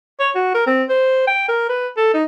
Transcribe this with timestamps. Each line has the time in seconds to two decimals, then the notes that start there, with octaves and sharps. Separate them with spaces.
0.20 C#5
0.35 F#4
0.54 A#4
0.66 C4
0.89 C5
1.27 G5
1.48 A#4
1.69 B4
1.97 A4
2.14 D#4